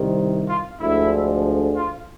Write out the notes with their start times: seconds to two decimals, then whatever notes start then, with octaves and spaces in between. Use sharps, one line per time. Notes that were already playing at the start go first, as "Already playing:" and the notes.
Already playing: C2 C3 D#3
0.47 F4
0.79 D2 D3 F3 G#3 E4
1.75 F4